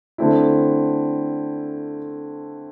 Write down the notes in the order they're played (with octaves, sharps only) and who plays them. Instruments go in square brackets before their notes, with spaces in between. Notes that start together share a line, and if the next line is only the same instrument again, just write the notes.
[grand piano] D3 A3 C4 E4